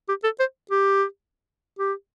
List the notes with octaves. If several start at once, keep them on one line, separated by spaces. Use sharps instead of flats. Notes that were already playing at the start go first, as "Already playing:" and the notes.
G4
A4
C5
G4
G4